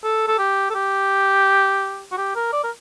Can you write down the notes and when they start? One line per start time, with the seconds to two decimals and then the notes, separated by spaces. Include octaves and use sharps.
0.04 A4
0.28 A4
0.39 G4
0.70 A4
0.75 G4
2.12 F#4
2.18 G4
2.36 A#4
2.53 D5
2.64 A#4